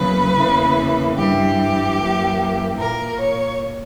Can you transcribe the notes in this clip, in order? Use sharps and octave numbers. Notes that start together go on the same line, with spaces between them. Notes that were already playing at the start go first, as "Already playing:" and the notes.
Already playing: E2 C#3 F#3 A#3 B4
E2 C#3 E3 A#3
G2 E3 G3 G4
F#2 E3 A#3
A#2 A#3 A#4
C#5